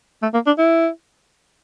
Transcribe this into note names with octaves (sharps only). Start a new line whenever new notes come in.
A3
A#3
D4
E4